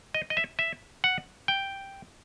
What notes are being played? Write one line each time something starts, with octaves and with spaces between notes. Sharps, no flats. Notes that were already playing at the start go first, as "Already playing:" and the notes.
D#5
D#5
E5
E5
F#5
G5